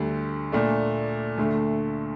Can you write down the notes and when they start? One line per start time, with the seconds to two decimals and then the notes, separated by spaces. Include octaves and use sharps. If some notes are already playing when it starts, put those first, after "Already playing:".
Already playing: D2 D3 G3
0.52 A#2 A3 D4
1.38 D2 D3 A3